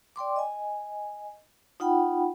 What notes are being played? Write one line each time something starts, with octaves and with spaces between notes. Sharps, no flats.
D5 G5 C6 D6
D#5 G#5
D#4 F4 F#5 G5 B5